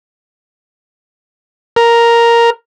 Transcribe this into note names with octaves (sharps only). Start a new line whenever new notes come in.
A#4